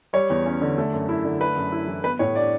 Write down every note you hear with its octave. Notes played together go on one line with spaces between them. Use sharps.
G3 C#5
E2
C#4
D3
A3
F#2
E4
D3
A3 B4
F#2
E4
E3
B3 B4
A2 C#5
D4 D5